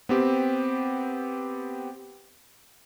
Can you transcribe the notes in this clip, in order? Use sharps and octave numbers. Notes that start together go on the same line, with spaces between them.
B3 C4 G4